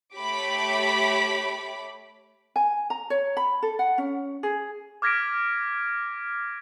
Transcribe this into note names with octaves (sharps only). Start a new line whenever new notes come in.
A3 G4 C#5 B5 D6 B6
G#5
A#5
C#5
B5
A4
F#5
C#4
G#4
D6 F6 G#6 A#6 B6 D7